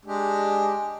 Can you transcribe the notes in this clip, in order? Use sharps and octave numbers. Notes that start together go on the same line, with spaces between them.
G#3 D4 G4